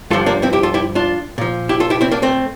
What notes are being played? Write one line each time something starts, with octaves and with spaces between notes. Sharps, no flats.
G2 D3 F3 F4 A4
A#3 D4
C4 E4
E4 G4
F4 A4
E4 G4
D4 F4
A#2 F3
E4 G4
F4 A4
E4 G4
C4 E4
A#3 D4
A3 C4